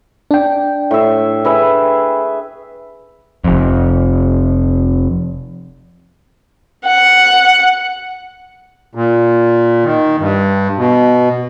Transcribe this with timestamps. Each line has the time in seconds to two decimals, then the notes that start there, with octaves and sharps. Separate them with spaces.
0.31 D4 G5
0.91 A2 E5
1.45 G#4 B4 E5
3.44 F1 F2
6.85 F#5
8.95 A#2
9.84 D#3
10.19 G2
10.78 B2